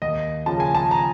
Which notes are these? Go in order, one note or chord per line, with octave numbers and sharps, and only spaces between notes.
D#2 D#5
C#3 F3 A5
G#5
A5
A#5